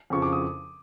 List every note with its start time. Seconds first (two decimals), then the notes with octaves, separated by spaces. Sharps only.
0.10 F2 C#3 F3 C#6
0.22 D6
0.33 D#6